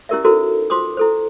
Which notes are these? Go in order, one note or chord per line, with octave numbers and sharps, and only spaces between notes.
C#4 E4 G4 A#4 D5 E5
D#4 E4 F#4 A4 A#4 C5
F4 C5 C6 D6 D#6
E4 A4 C5